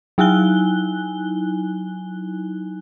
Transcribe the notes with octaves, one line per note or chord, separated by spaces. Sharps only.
F#3 D#4 E4 G#5 F#6 G7